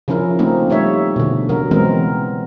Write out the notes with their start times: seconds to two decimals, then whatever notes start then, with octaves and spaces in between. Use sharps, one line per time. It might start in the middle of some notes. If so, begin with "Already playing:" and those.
0.08 C#3 F3 C#4 E4 A#4
0.39 A3 A#3 C4 D#4
0.70 G3 D#4 C#5 E5
1.16 B2 D3
1.49 C#3 F#3 A#4
1.71 E3 G#3 B3 C4 A#4